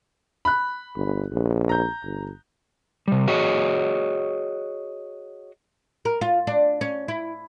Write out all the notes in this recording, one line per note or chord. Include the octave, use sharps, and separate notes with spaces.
B5 F#6
G1
A#1
A#5 G6
G1
C3 G3
F#4 G#4 C#5 D#5
A#4
F4
D4
C#4
E4